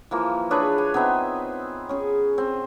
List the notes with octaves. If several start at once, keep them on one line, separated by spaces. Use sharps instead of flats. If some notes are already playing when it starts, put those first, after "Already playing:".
E3 F3 A#3
D4 G#4 B4 C#5
G#5
B3 C4 D#4 E5
C#4 G#4
C4